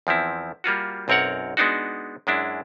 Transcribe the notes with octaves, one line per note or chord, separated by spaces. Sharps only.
E2 F3 C4 E4
G3 A#3 F4 F#4
B1 F#2 C4 A#4 C#5 F#5
G#3 B3 D4 D#4 F#4
F#2 G#3 D4 E4